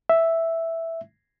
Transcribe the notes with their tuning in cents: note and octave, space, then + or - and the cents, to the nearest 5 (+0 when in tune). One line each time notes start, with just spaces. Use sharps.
E5 +0